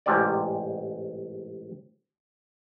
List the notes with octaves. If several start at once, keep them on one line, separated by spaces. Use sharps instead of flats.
A1 G#2 C3 C#4 D5